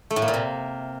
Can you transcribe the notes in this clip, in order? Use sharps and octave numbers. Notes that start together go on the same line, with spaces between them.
A3
A2
A#3
A#2
C3